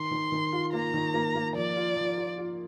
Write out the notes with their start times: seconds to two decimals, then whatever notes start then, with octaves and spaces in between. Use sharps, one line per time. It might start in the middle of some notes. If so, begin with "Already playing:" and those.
Already playing: D#3 C6
0.11 D#3
0.32 D#3
0.53 F4
0.73 A#3 A#5
0.94 D#3
1.14 A#3
1.35 A#3
1.55 F3 D5
1.76 F4
1.97 F3
2.17 F4
2.38 F4